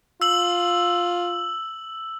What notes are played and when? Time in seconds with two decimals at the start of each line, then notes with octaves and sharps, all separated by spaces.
0.22 F4 E6 F#7